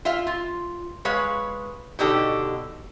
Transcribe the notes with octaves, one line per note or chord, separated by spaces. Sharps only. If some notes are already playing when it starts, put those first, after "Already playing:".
F4 E5 F5
F4
G#3 B4 C#5 F5
B2 D3 D#4 G4 A4